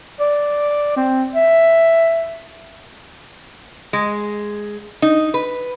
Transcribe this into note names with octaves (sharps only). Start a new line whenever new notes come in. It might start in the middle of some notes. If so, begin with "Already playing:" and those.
D5
C4
E5
G#3
D#4
B4